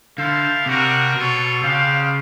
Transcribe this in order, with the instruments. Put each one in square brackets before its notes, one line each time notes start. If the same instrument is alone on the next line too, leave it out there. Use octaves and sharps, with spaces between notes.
[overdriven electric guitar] D3 [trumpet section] E4 A4 C5 F5
[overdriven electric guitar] C3 [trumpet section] G3 A#3 D4 F#4 A#4
[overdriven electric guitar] B2 [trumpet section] F4 A4 C#5
[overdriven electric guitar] C#3 [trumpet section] D4 G4 C5 F5